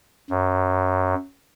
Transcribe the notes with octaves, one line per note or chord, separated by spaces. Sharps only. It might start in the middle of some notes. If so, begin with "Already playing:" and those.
F#2